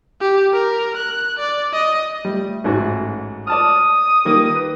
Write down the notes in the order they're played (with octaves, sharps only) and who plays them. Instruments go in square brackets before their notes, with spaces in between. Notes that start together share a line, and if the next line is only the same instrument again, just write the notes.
[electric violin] G4
A#4
F#6
D5
D#5
[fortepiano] G3 [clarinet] A3
[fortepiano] A1 G#2 F#4
[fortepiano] D5 A5 F6 [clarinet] D#6
[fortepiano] D#3 G3 A#3
[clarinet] B4